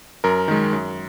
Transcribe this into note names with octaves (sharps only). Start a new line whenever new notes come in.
F#2 A#4
D#3 G#3
F#2